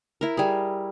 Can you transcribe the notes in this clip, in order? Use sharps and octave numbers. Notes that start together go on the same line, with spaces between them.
E4 A#4
G3 G#4